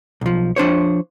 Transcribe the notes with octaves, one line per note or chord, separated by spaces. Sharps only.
B1 F3
F3 D4 C5 C#5